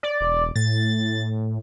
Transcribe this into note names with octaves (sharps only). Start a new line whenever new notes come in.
D5
E1
A2 A6